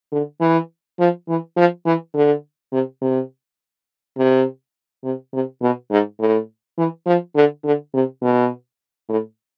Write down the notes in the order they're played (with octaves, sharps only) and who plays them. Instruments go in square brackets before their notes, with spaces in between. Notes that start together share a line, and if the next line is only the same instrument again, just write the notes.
[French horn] D3
E3
F3
E3
F3
E3
D3
C3
C3
C3
C3
C3
B2
G#2
A2
E3
F3
D3
D3
C3
B2
A2